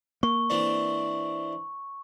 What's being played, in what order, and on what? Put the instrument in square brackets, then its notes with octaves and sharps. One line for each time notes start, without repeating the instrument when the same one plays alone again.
[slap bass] A#3 [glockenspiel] C#6
[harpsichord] E3 C4 D4